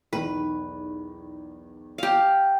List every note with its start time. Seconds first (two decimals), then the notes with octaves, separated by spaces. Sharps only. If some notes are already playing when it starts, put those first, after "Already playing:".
0.13 B1 E2 D#3 B4
1.98 G4 F5